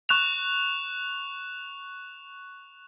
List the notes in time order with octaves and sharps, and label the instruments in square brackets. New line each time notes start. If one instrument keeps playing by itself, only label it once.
[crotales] C#6 F#6 E7 F7